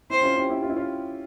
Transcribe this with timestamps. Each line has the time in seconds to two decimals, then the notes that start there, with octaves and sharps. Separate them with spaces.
0.10 C4 E4 C5
0.23 C#4 F4
0.36 E4 G4
0.49 E4 G4
0.63 F4
0.70 E4
0.76 C#4 F4